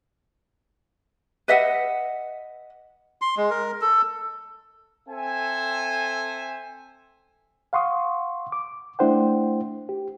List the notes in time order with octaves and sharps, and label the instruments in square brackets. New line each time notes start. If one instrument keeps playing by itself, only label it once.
[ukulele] B4 D#5 E5 F#5
[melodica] C6
G#3
A#4
A4
[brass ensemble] C4 A4 C5 E5 G#5
[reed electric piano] F5 F#5 C6 C#6 D#6
D6
A3 D4 E4 C5 F#5 G5
G4